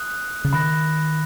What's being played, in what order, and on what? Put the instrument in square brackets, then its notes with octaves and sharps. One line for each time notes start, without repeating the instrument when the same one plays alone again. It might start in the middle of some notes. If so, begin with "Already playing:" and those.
Already playing: [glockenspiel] D#6 F#6
[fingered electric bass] C#3
[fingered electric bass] D#3 [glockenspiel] B5 F#6 A#6